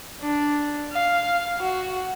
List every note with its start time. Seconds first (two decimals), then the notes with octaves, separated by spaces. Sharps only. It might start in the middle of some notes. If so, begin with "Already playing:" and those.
0.21 D4
0.93 F5
1.59 F#4